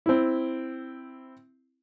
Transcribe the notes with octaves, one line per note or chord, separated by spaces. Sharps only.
C4 E4